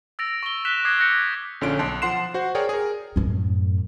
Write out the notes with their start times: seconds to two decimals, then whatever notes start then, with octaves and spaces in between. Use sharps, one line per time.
0.19 E6 A6 A#6 D7 F7
0.43 C#6 G7
0.65 F#6 B6 E7 F7 G7
0.85 D6 D#6 F#6 G#6 A#6 C7
0.99 F#6 G6 A#6 C#7
1.61 A#1 D3 C#4 F4 D7
1.79 B1 A5 C6 F#6
2.02 F3 F#5 C6 C7 E7
2.34 F#4 C5 F#5
2.55 G#4 A#4 C#5 D5 G5 G#5
2.69 G#4 A#4
3.16 F#2 A2